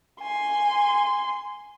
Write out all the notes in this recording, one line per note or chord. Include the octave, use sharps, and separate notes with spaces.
G#5 C6